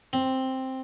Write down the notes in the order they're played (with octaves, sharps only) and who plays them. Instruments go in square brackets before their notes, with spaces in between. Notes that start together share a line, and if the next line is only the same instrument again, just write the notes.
[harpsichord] C4